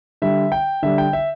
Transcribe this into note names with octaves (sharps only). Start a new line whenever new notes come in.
D3 G3 E5
G5
D3 G3 E5
G5
E5